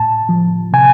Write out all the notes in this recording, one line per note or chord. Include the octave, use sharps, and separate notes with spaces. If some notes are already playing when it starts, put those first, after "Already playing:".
Already playing: A2 A5
F3
C3 G#5